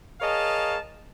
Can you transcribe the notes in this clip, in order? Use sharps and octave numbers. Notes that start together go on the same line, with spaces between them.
G#4 A#4 C#5 D#5 F5 A5